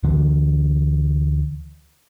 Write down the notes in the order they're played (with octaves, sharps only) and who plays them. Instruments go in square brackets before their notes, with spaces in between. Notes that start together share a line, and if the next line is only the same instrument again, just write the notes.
[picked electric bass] D2 D3 E3